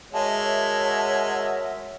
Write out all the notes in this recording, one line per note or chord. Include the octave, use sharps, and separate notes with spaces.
G#3 F#4 A#4 C#5 E5 A5